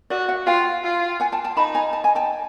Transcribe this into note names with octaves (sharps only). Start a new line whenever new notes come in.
F#4 D5 E5
E5 F#5
F4 F5 G5
F4
F#5 G#5
G5 A5
G5 A5
D#4 A5 B5
G#5 A#5
A5
G#5
G5 A5